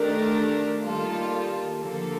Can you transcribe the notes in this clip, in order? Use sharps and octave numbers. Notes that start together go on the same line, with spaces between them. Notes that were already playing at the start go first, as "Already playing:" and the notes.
Already playing: D#3 A3 D4 G4 A#4
D#3 G3 A#3 F4 A4
D3 F3 A#3 D4 A4